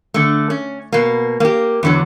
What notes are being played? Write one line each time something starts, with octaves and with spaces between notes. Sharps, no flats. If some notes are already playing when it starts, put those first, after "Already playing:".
D3 A3
C#4
B2 A#3
A#3 G4
E2 D3 F#3